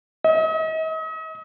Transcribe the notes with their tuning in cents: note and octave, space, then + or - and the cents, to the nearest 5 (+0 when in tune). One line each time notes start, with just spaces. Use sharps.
D#5 +40